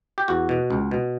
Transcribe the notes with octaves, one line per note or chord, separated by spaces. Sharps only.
G4
E2 F#4
B2
C#2
B2